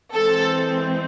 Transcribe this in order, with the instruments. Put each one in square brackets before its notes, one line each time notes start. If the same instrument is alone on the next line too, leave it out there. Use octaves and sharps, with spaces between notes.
[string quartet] E3 G#3 C4 [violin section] A4